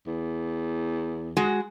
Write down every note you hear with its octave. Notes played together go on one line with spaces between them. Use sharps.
E2
G#3 F#4